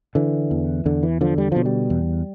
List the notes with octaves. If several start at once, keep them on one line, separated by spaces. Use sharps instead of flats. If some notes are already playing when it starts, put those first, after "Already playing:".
D3 E3
E2
E2 D3
E3
D3 F3
G3
B2 F3
G3
E2